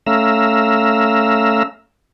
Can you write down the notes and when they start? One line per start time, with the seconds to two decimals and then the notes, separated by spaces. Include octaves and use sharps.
0.07 A3 C#4 E5 F5 A#5 E6